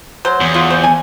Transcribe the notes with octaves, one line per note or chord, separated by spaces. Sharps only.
F#3 C5
E2
F4 F#4 C6
C5
G#5